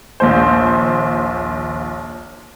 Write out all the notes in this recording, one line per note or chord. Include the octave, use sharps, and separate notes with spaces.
A#1 D#2 C5